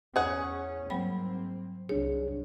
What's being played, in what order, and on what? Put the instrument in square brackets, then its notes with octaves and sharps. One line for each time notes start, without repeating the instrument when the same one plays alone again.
[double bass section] E2 C#4 [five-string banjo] G#4 F#5
[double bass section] G#2 A#3 C4 [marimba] F#3 G3 B5
[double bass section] C2 [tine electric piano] D4 G#4 [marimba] C#5